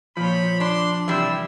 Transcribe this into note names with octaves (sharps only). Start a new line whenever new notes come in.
A#2 F3 C5 C#5 B5
D4 D5 C6
C3 E3 G3 E4 E6